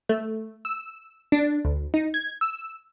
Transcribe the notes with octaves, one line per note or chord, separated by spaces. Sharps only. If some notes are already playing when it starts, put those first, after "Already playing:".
A3
E6
D4
D2
D#4
G#6
E6